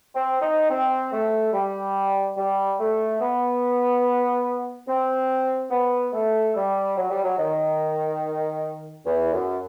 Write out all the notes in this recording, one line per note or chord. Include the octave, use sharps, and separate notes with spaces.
C4
D#4
C4
A3
G3
G3
A3
B3
C4
B3
A3
G3
F#3
G3
F#3
D#3
E2
F#2